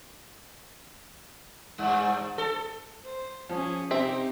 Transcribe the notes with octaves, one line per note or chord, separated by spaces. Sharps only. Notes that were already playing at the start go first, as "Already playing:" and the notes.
G2
A4
C5
F3 C#4 G#4
C3 C4 D#4 G4 E5